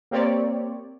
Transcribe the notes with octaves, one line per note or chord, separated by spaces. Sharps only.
A#3 C4 G4 C#5 D5